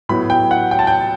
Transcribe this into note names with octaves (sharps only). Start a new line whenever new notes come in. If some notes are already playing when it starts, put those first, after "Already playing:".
A2 F#3 B3 B5
G5
F#5
G5
A5
G5